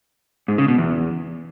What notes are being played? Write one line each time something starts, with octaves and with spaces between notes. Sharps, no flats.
G#2
C#3
B2
E2